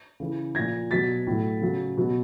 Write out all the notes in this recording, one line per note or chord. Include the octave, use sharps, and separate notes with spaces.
C#3 E3
A#2 F3 G#6 A#6
B2 F#3 A6 B6
A2 F#3
C#3 F#3
B2 F#3